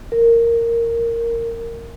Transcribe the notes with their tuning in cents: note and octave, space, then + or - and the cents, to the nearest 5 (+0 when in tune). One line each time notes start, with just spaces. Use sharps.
A#4 -10